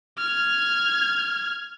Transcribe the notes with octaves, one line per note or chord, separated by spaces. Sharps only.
F6 G#6